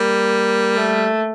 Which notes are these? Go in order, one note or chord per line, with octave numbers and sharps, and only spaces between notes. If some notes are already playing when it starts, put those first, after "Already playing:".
Already playing: G3 A#3
A3